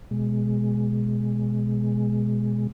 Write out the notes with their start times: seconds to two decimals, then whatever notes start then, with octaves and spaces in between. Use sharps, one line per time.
0.11 B2 G#3